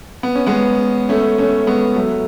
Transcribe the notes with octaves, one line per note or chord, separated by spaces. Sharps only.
B3
C#4
G#3 B3
A3 C#4
A3 C#4
G#3 B3
F#3 A3